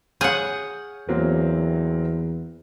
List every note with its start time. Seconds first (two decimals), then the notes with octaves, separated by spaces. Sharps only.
0.21 G#4 C#5 F#5 F6 G6
1.09 E2 F#3 A#3 C4